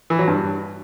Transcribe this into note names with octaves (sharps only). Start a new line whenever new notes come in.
E3
F#3
G2